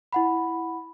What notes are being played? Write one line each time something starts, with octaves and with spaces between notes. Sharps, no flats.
E4 F#5 B5